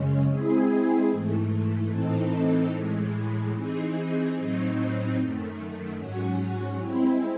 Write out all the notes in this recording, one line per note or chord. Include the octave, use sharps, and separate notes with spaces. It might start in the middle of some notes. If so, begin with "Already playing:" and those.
Already playing: F#2 C#3 G#3 C#4
G#3 C4 E4 G#4
G#2 E3 A3
A2 E3 C4 D#4 A4
A2 E3 G#3
E3 C4 D#4 G#4
A2 F#3 C4 D#4
F#2 D#3 A3
G#2 F#3 C#4 F#4
G#3 C4 E4